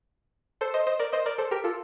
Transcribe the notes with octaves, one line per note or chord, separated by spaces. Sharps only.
A4 C5
C5 D#5
C5 D#5
A#4 D5
C5 D#5
A#4 D5
A4 C5
G4 A#4
F4 A4